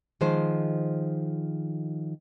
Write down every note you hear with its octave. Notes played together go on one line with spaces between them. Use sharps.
D#3 F3 G#3 C5